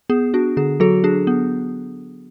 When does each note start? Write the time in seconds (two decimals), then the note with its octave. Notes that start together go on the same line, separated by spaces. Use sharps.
0.10 B3 G#4
0.34 D4 F#4
0.57 D3 G#4
0.80 F#3 F#4 A4
1.04 D4 G#4
1.27 B3